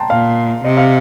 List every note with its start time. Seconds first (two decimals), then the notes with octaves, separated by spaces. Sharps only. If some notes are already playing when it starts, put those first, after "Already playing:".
Already playing: G5 A5 A#5 C6
0.10 A#2 F5
0.64 C3 D#5
0.77 F5